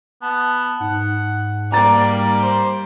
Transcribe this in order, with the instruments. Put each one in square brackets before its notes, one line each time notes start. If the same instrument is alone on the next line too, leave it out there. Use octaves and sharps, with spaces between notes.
[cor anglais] B3 [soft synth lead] A5
[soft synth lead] G#2 [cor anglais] F#5
[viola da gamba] G3 A#3 G4 [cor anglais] D5 [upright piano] A#5 A6
[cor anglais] C5